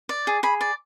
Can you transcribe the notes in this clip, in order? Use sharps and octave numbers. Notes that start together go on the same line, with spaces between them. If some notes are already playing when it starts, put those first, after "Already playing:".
D5
G#4
G#4 B5
D5